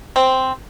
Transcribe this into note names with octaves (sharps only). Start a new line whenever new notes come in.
C4